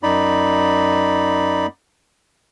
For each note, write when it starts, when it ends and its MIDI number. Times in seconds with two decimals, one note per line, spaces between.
0.03 1.66 42
0.03 1.66 63
0.03 1.66 74
0.03 1.66 83